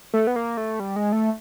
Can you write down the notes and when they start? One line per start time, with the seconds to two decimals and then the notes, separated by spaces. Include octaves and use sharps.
0.13 A3
0.27 B3
0.36 A#3
0.57 A3
0.80 G3
0.96 G#3
1.12 A3